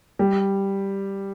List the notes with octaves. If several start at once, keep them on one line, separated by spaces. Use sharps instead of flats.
G3